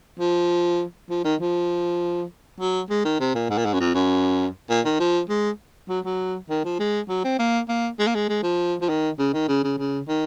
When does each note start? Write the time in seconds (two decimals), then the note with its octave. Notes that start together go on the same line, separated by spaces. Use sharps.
0.20 F3
1.10 F3
1.24 D#3
1.40 F3
2.60 F#3
2.90 G#3
3.05 D#3
3.20 C3
3.35 A#2
3.50 G#2
3.58 A#2
3.65 G#2
3.73 F#2
3.80 F2
3.94 F#2
4.70 A#2
4.85 D#3
5.00 F3
5.29 G#3
5.89 F#3
6.05 F#3
6.50 D#3
6.65 F3
6.80 G#3
7.09 F#3
7.24 C4
7.39 A#3
7.69 A#3
7.99 G#3
8.07 A#3
8.15 G#3
8.29 G#3
8.43 F3
8.81 F3
8.89 D#3
9.19 C#3
9.34 D#3
9.48 C#3
9.64 C#3
9.79 C#3
10.09 D#3